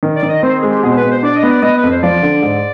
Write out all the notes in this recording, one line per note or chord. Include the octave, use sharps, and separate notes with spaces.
D#3
D5
D#3
D#5
C4 C5
G#3 G#4
G4
B2 G#4
C5
B4
B2
C5
D4 D5
D#5
B3
D5
B3 D#5
B4
F2
C5
F3 D5
D3
G#2